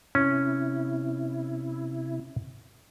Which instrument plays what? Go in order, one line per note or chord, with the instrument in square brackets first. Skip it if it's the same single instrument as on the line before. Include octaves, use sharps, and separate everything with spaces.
[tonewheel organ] C3 E4 [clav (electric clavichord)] C#4